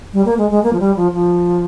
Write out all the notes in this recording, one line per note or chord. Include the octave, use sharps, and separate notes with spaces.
G3
A#3
G#3
G#3
A#3
F3
G3
F3
F3